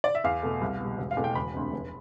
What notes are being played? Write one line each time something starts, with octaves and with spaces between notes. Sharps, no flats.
D5
E5
E2 F5
B2 A3
C2
B2 G3
E1
F5
E2 B2 A3
G5
E1 B5
D2 C3
F1